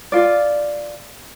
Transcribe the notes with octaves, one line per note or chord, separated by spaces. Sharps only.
F4 D5